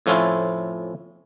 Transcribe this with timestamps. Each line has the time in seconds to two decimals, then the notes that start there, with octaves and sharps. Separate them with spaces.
0.06 F2 A2 F3 C#4 E4 F4